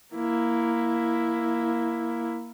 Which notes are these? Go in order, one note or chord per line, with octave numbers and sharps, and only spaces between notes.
A#3 E4